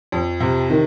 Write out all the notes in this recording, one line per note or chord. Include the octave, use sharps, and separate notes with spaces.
F2
C3
D#3